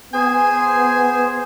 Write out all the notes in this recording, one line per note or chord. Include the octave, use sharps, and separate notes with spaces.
B3 G#4 C5 G#5